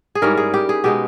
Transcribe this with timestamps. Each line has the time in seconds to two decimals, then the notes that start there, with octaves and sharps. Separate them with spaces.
0.15 G#4
0.22 G#2 G3 C#4 E4 A#4
0.37 G#4
0.54 G4
0.69 G#4
0.84 B2 G#3 B3 D#4 G4